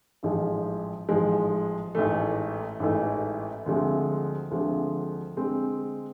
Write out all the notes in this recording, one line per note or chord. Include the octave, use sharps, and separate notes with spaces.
A1 G#2 F3 G#3
A1 G#2 F3 G#3
A1 G#2 E3 A3
A1 G#2 E3 A3
D2 D3 F3 G#3 C4
D2 D3 F3 G#3 C4
D3 G#3 C4